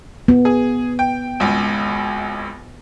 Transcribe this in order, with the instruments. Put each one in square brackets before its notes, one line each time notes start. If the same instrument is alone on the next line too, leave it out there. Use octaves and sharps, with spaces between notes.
[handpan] B3
[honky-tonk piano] G#4
G5
G#1 C#2